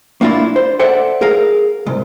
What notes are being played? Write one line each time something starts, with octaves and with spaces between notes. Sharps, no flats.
A#3 D4 E4 F4
C5
A4 C5 D5 E5 F#5
G#4 A#4 F5
C2 G#2